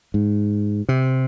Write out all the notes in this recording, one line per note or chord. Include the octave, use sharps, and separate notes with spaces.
G#2
C3